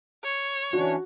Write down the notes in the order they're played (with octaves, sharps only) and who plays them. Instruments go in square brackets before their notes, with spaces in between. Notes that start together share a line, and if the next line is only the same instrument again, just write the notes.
[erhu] C#5
[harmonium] E3 C#4 D4 [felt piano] F#4